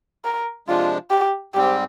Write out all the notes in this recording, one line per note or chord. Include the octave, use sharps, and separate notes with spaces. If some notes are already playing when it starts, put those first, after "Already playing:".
A#4
C3 F3 G#3 D4 F4
G4
G#2 G3 C4 G4